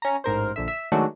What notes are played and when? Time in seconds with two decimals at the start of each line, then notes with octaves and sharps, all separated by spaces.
0.02 C#4 A#5
0.24 A1 G#2 A#4 C5
0.56 A#1 D3 E5
0.68 E5
0.92 D#3 F#3 G#3 A3 D4 F#4